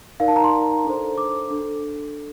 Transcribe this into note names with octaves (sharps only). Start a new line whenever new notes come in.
D#4 A#4 D5 F5
A5
A#5
C6
D4 A4 C5
D6
D4 A4